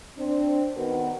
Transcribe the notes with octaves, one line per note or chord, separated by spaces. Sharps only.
C4 D4
D#3 B3 F#4 A#4 B4